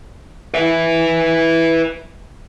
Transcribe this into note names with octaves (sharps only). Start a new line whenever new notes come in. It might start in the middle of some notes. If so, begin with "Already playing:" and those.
B4 E5